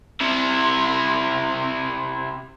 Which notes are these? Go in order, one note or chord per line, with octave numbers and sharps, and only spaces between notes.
C3 E4